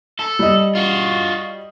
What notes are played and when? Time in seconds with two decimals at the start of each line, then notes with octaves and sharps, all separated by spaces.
0.19 A4
0.39 G3 D#5
0.75 F4 F#4